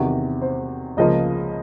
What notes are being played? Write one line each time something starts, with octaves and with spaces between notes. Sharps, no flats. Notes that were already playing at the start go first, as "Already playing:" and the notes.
Already playing: E2 C3 D#3 F#4
C5
C#2 C#3 F3 A#3 D#5